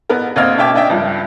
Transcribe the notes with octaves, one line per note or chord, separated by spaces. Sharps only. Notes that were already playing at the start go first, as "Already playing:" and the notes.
A1 B3 A#4
D2 A#3 C4 D#5 F6 G#6
B2 C#4 E5 G5 D6
C#4 D4 D#5 E5 G5
C#2 G2 F3